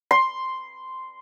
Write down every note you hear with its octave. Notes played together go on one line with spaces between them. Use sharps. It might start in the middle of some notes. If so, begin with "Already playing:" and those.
C6